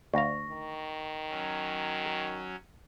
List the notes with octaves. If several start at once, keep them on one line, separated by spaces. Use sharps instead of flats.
D2 F5 C#6 A#6
D#3
F#3 C#4